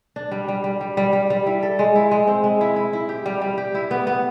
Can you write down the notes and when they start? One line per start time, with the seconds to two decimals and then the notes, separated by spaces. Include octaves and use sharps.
0.16 D4
0.31 G3
0.48 G3
0.64 G3
0.81 G3
0.97 G3
1.13 G3
1.30 G3
1.47 E4
1.63 A4
1.79 G#3
1.96 E4
2.11 G#3
2.27 C4
2.44 G#3
2.61 E4
2.76 E4
2.93 E4
3.09 G4
3.26 G3
3.42 G3
3.58 G4
3.74 E4
3.91 B3
4.07 B3